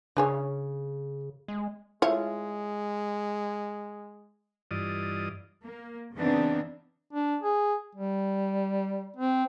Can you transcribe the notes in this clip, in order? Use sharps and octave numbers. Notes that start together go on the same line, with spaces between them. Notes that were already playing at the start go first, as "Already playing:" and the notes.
C#3 D4 G#4 C#5
G#3
G#3 E4 F4 C#5
G2 E3 F4 D5 D#5 D#6
A#3
C#3 E3 B3 C4 D4 D#4
D4
G#4
G3
C4